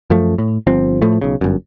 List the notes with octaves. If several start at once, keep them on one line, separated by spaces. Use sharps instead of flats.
F#2 F3 A3
A2
G1 F3 C4
A2 F3 A3
B1 C#3
G1 F#2